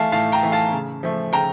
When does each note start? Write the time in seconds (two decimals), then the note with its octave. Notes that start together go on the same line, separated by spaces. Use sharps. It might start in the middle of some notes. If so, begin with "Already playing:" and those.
Already playing: E3 A3 F5 A5
0.12 A2 F5 A5
0.32 G5 A#5
0.43 E3 A3
0.52 F5 A5
0.72 C#3
1.03 F3 A3
1.33 C#3 G5 A#5